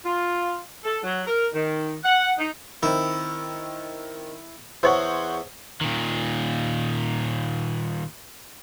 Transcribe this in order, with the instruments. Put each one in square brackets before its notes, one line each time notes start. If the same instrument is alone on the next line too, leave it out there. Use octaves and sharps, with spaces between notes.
[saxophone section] F4
A4
F#3
A#4
D#3
F#5
D#4
[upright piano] D#3 C4 [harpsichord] E4
[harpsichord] E2 [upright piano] C5 C#5 F#5
[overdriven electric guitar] A#2 D#3